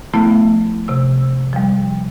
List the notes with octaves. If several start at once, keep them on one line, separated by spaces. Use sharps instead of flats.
F3 A3 B3 E4
C3 E6
F3 G3